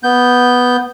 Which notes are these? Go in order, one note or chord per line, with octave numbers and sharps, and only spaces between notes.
B3 G6